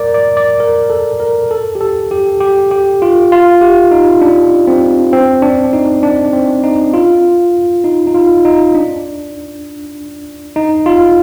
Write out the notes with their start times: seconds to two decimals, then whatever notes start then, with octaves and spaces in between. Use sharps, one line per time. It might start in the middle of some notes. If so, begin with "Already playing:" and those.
Already playing: A#4 D5
0.14 D5
0.37 D5
0.60 A#4
0.90 A4
1.20 A#4
1.51 A4
1.75 G4
1.81 A4
2.11 G4
2.40 G4
2.71 G4
3.02 F4
3.32 F4
3.61 G4
3.91 D#4
4.22 D4
4.67 C4
5.13 C4
5.42 D4
5.73 D#4
6.03 D4
6.33 C4
6.64 D#4
6.94 F4
7.84 D#4
8.07 D#4
8.14 F4
8.45 D#4
8.75 D4
10.56 D#4
10.86 F4